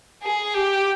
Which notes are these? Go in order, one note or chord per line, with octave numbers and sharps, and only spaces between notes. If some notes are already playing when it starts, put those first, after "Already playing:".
G#4
G4